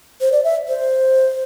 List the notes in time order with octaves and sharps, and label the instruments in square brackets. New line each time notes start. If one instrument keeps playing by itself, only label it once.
[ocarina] C5
D5
E5
C5